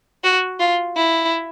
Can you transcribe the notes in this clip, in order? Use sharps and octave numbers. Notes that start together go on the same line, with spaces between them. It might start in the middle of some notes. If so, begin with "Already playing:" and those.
F#4
F4
E4